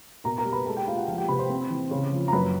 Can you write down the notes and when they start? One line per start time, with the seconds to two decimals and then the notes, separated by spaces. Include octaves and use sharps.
0.24 B2 A#4 A#5
0.38 A#4 A#5
0.45 G3
0.52 B4 B5
0.66 G#3 A4 A5
0.77 G4 G5
0.87 G#3 F4 F5
0.97 F#4 F#5
1.08 F3 F4 F5
1.18 G4 G5
1.28 C3 B4 B5
1.39 C5 C6
1.49 C4
1.70 E3
1.91 C#3
2.12 F3
2.28 A#5
2.32 F#2 B4 B5